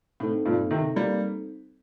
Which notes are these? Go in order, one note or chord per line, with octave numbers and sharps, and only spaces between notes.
A2 C4 D#4 A4
G2 A#2
C3 D#3
G3 A#3